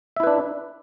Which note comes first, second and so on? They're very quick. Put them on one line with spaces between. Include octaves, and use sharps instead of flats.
E5 E4 B4 D4